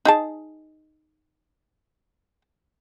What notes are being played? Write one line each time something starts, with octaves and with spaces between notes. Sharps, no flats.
D#4 G#4 A5